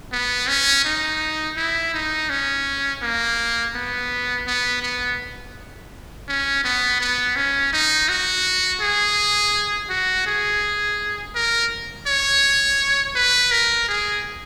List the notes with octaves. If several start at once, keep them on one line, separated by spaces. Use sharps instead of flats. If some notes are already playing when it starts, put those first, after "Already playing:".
B3
C#4
D#4
E4
D#4
C#4
A#3
B3
B3
B3
C#4
B3
B3
C#4
D#4
F#4
G#4
F#4
G#4
A#4
C#5
B4
A#4
G#4